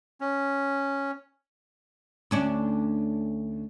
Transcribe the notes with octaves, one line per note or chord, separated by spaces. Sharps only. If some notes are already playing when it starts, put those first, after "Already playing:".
C#4
D2 C#4 D4